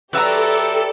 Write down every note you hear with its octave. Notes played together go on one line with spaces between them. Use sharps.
F#3 G4 A4 B4 D5 E5 A5 A#5